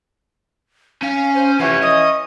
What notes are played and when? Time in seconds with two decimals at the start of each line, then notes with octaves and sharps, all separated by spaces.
1.03 C#4 F5 G#5
1.35 C5
1.60 E3 F3 C#4 G4 F#5
1.82 D#5 D#6